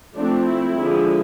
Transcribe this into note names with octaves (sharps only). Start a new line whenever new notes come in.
F3 A3 C4 D4
E4
D3 F3 G#3